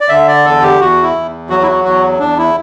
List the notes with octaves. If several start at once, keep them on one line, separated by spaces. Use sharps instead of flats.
D5
D3 E5
D5
E2 A4
G4
E2 F#4
E4
E2
F#3 F#4
E4
F#4
E2 F#4
E2 D4
E4